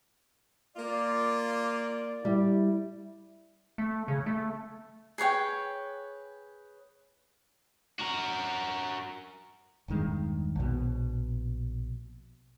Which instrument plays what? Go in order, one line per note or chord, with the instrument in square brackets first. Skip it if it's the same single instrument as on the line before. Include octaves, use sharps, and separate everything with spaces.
[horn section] A#3 F4 [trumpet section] D5
[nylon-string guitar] G3 [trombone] E4
[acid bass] A3
C#3
A3
[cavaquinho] G#4 B4 C#5 G5
[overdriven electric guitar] F#4 A#4
[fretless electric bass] E1 G2 D#3 G#3
A#1 B2